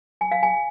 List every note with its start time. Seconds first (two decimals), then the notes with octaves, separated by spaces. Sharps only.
0.21 G#5
0.31 F5
0.43 G#5